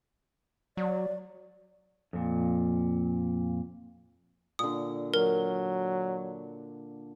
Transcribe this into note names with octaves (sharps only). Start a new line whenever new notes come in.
F#3 D5
F2 A#2
A#2 D3 D#6
F#3 A#4